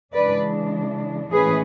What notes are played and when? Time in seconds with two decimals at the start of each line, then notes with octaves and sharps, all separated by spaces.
0.13 C#3 E3 G#3 D4 B4 D5
1.32 A2 E3 G#3 C#4 G#4 B4